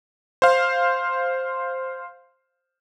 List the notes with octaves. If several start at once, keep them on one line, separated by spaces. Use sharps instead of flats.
C5 F5